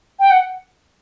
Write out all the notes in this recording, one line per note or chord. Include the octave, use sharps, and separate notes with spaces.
G5
F#5